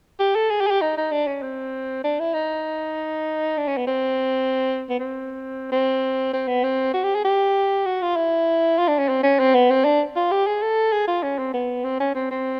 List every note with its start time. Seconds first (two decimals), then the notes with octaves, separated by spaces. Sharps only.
0.20 G4
0.35 A4
0.50 G#4
0.61 G4
0.67 G#4
0.71 G4
0.81 D#4
0.97 D#4
1.12 D4
1.27 C#4
1.43 C4
2.04 D4
2.20 E4
2.34 D#4
3.58 D4
3.68 C#4
3.77 B3
3.87 C4
4.90 B3
5.00 C4
5.72 C4
6.33 C4
6.48 B3
6.64 C4
6.94 F#4
7.04 G4
7.15 G#4
7.25 G4
7.86 F#4
8.02 F4
8.16 E4
8.78 F4
8.88 D4
8.98 C#4
9.09 C4
9.23 C#4
9.40 C4
9.55 B3
9.70 C4
9.85 D4
10.16 F4
10.31 G4
10.47 G#4
10.62 A4
10.92 G#4
11.07 F4
11.23 C#4
11.38 C4
11.53 B3
11.84 C4
12.00 C#4
12.15 C4
12.31 C4